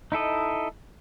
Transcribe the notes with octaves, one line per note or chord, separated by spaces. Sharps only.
D#4 E4 A4 D#5